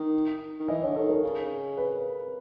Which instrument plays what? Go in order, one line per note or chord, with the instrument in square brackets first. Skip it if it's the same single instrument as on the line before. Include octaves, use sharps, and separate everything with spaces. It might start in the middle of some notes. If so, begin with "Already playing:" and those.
Already playing: [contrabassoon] D#3
D#3
[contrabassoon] E3 [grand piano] D#5
[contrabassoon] D3 [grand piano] C#5
[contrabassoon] D#3 [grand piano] A4
[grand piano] A#4
[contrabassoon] C#3
[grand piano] B4